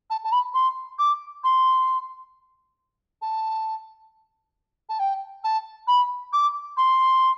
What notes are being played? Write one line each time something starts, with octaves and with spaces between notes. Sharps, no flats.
A5
A5
B5
C6
D6
C6
A5
A5
G5
A5
B5
D6
C6